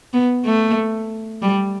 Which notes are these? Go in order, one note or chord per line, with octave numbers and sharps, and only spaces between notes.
B3
A3
G3